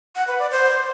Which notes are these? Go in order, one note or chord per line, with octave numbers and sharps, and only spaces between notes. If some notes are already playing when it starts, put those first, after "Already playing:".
F#5
B4
D5
C5